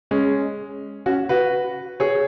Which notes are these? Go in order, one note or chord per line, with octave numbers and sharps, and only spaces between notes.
G#3 C#4
C#4 F#4
F#4 B4
G#4 C#5